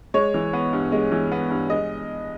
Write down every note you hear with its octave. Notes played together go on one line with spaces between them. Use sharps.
G#3 C#5
E3
B3
G2
G#3
E3
B3
G2
G#3 D#5